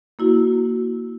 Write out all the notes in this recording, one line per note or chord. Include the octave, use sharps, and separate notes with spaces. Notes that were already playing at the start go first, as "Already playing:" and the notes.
A#3 E4 F#4